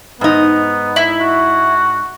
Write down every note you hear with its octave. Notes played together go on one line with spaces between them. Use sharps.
G#2 B3 D#4
E4
F#4